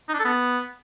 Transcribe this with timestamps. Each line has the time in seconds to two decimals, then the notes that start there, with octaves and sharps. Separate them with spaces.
0.09 D#4
0.14 D4
0.19 A4
0.24 B3